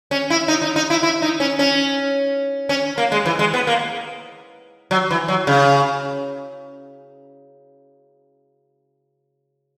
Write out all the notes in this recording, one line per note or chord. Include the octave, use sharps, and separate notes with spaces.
C#4
E4
D#4
D#4
D#4
E4
E4
D#4
C#4
C#4
C#4
A#3
G#3
E3
G#3
B3
A#3
F#3
E3
F#3
C#3